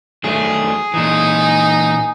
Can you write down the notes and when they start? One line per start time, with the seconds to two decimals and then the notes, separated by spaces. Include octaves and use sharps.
0.24 D#3 F#3 A3 G#4
0.94 A#2 E3 D#4